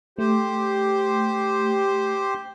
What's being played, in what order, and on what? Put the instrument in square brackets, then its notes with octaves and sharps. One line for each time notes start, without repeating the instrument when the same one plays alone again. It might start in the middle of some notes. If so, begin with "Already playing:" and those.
[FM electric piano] A3 [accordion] G4 C5